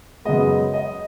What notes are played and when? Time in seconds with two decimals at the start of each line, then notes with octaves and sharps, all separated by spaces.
0.25 F#2 C#3 G#3 B3 D#5
0.74 D#5